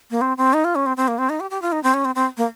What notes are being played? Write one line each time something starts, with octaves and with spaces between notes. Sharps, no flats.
A#3
C4
C4
D#4
F4
C#4
C4
C4
A#3
C4
D#4
G4
G4
F4
D#4
C4
C#4
C4
C4
A#3